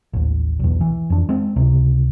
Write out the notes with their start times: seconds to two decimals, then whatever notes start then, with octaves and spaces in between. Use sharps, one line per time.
0.13 A1 D#2
0.59 B1 E2
0.81 E3
1.10 F2 D4
1.29 G#3 C4
1.56 C#2 C3